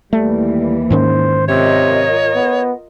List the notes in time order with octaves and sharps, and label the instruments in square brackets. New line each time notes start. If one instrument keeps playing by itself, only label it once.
[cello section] D#2 E3 A#3 [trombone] G3 [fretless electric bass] A3
[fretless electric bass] G#2 D#3 C#4 [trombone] C5
[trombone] C3 [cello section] F4 A#4 D#5 [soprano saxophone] C#5
[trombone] B3